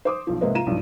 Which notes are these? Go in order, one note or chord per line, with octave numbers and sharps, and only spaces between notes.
C5 D6 D#6
B1 F3
G#2 C3 A#3 B4 C5 D#5
F4 A#5 D#7 E7
B1 E2 G2 F3